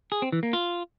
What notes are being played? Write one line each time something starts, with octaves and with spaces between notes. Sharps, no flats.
G#4
C4
E3
A#3
F4